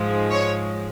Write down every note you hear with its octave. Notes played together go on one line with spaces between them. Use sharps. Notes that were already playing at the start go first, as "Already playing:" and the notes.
Already playing: G#2 F3 G#3
C#5